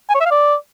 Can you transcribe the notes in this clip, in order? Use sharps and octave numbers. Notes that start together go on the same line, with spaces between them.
G#5
C#5
E5
F5
D5